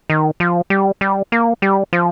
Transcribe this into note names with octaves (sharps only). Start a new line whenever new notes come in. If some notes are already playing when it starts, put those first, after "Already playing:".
D#3
F3
G3
G3
A#3
G3
F3